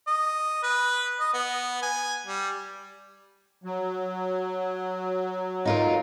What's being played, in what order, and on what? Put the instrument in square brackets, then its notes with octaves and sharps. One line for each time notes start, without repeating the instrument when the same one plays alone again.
[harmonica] D#5
B4
D#5
B3
G#5
G3
[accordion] F#3
[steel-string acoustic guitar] D#4 F4 A#4